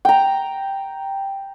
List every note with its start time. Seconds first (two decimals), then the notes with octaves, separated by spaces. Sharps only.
0.05 G5 A#5